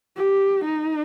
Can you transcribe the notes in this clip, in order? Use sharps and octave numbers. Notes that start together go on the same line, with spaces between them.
G4
D#4